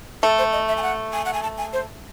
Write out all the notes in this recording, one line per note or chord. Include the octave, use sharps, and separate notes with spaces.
A3 A4
C5
D#5
E5
G#5
F#5
G#5
F#5
G#5
A5
G#5
C5